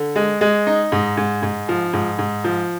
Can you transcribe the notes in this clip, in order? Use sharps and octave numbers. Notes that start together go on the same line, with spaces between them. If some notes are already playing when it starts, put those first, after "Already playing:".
Already playing: D3
G#3
G#3
D#4
G#2
G#2
G#2
F3
G#2
G#2
F3